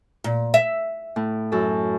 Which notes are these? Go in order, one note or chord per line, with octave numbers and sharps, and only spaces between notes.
A#2
E5
A2
F#2 A4